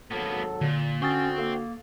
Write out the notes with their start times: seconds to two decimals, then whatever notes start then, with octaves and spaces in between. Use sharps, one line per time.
0.11 G#1 F#3 A#3 B3 A4
0.61 A#2 D3
1.02 D3 C#4 F#4 C5 G5 C#6 D#6 A6
1.38 A#3 A4 F5